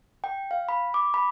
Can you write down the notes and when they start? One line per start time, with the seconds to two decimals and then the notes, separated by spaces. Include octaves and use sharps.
0.24 G5
0.51 F5
0.69 B5
0.94 D6
1.14 B5